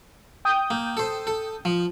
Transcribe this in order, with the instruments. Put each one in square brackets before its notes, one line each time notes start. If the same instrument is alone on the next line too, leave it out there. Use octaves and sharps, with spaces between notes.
[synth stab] G5 D#6 G6
[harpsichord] A#3
A4 C5
A4
F3